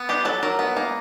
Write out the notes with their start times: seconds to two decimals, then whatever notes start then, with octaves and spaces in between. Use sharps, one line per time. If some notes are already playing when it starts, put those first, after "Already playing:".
Already playing: B3
0.09 D4 G4
0.25 F#3 A4
0.43 F#3 A#4
0.59 B3
0.77 A#3